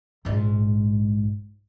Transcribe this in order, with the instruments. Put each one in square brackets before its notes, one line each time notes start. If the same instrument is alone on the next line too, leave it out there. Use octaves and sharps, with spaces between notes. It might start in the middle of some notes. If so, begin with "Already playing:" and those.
[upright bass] A#1 G#2